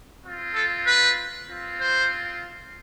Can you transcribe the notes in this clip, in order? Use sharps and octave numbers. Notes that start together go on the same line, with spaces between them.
C4 F4
A4
B4
C4 F4
C5